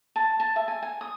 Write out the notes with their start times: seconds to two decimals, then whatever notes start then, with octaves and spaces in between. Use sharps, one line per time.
0.16 A5
0.40 A5
0.56 E5
0.68 G#5
0.82 G#5
1.01 D#6